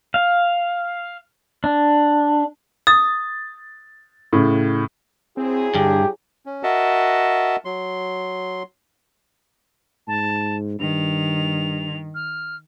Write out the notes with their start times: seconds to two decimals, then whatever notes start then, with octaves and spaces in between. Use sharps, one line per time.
0.14 F5
1.64 D4
2.87 D#6 A6
4.33 A2 C#3
5.37 F#3 C4 E4 G#4
5.75 G2 D3 G4
6.46 C#4
6.63 F#4 A#4 D#5 E5 F#5 A5
7.65 F#3 C6
10.08 G#2 A5
10.80 G2 D#3 F7
12.15 F6